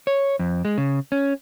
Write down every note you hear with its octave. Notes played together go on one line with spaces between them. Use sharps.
C#5
F2
G#3
C#3
C#4